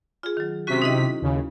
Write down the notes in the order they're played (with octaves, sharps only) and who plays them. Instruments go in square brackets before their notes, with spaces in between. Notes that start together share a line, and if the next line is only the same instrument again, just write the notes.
[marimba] F4 G#4
D#3 F#3
[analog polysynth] C3 B6 [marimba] C#4 F#4
[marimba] D#4 E4 D#5
[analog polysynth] D#2 C#3